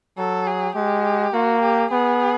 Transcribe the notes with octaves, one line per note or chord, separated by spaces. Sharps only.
F#3 A4
G#4
G#3 G4
A#3 F#4
G4
B3 G#4